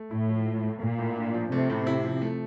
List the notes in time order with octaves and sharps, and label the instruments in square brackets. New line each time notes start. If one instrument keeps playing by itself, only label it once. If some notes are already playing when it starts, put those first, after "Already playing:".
Already playing: [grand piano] A3
[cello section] A2 [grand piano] E4
[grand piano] F3
F3
A3
[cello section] A#2 [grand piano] A#3
[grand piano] A2
D4
F3
[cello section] C3 [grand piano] A3
[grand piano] A2
E4
F3
A3